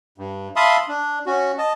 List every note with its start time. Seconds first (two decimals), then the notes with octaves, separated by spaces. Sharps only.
0.18 G2
0.56 E5 F5 A5 B5 C6 D#6
0.88 D4
1.26 C#4 F#4
1.58 D#5 A5